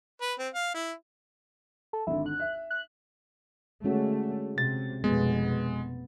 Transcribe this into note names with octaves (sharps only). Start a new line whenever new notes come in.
B4
C4
F5
E4
A4
G#1 D3 E4
F#6
E5
F#6
D3 G#3 A3 C#4 F#4
C3 A6
F1 B2 G#3 B3